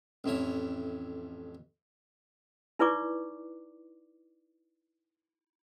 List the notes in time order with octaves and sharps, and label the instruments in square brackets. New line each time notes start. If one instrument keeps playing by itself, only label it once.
[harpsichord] A1 F2 E4 C#5
[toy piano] D#4 E4 B4 D5 C#6 D6